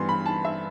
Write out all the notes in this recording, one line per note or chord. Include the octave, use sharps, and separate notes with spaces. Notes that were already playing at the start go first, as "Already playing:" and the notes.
Already playing: G2 E3 B3 C6
B5
A5
E5